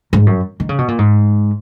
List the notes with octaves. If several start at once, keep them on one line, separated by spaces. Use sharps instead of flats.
G#2
F#2
D#3
C#3
B2
A#2
G#2